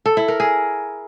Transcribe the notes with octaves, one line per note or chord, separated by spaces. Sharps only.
A4
E4
A#4
G#4